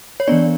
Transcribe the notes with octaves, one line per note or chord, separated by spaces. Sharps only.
C#5
E3 B3 D4 D5